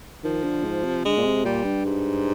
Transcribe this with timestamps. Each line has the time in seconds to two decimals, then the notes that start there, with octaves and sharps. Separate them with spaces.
0.24 D#3 F3
0.44 D3
0.64 G#2
0.84 C3
1.05 D3 G#3
1.17 A#2
1.25 C3
1.44 A#2 G3
1.65 G2
1.85 G#2